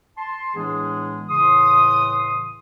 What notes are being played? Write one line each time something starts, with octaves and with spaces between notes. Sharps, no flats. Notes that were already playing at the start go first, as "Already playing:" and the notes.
A5 C6
A2 E3 G#3 B3 D4 G#4
A2 C#3 E3 C6 D#6